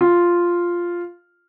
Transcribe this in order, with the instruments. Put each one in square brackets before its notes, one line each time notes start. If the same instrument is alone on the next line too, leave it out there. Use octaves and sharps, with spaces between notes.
[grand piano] F4